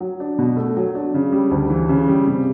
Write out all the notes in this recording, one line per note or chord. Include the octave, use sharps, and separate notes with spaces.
F#3
D4
B2
A3
F#3
D4
C#3
G3
D2
E3
C#3
G3
C3